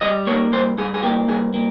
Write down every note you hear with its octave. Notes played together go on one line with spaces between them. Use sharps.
G3 D#5
A#3 C#5
G2 C5
G2 G#4
G#4
A#3 G4
G2 G#4
A#3